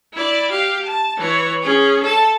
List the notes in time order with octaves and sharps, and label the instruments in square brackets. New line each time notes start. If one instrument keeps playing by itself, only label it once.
[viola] E4 D5
G4 F5
A5
E3 C#5
C#4 G#4
A4 A5